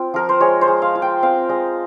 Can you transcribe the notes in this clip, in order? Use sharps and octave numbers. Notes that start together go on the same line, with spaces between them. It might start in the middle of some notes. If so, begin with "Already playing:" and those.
Already playing: C4 F4 G5
F3 A#4
C5
G#3 C#5
C5
G#3
F5
F4
G5
C4 F5
G#3 D#5